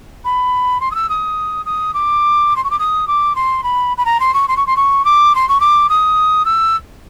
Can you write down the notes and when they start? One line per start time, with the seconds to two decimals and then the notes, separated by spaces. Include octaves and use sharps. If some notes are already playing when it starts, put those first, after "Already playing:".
0.25 B5
0.80 C6
0.91 D#6
0.95 E6
1.09 D#6
1.65 D#6
1.94 D6
2.56 C6
2.64 C#6
2.70 D6
2.79 D#6
3.07 D6
3.35 C6
3.63 B5
3.98 B5
4.05 A#5
4.20 C6
4.34 C#6
4.48 C6
4.57 C#6
4.67 C6
4.76 C#6
5.05 D6
5.35 C6
5.48 C#6
5.60 D6
5.89 D#6
6.45 E6